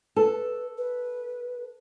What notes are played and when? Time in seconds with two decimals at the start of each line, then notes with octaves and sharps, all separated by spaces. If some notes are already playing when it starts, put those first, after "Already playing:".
0.16 A4 B4
0.78 B4